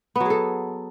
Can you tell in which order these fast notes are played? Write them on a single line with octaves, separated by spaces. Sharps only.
B3 F#3 G#4 A4